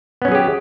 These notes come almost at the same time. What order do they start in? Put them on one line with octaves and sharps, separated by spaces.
B3 C#4 F#3 G#4 G4